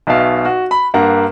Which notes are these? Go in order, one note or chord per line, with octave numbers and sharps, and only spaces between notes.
B1 B2 E5 F5
F#4
B5
G2 A#3 F#5 A#5